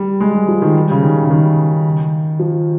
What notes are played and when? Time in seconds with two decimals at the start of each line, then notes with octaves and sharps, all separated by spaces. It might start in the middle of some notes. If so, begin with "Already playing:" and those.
Already playing: G3
0.20 G#3
0.35 G3
0.48 F3
0.62 D#3
0.75 G3
0.91 C#3
1.03 D#3
1.25 C#3
1.30 D#3
2.39 F3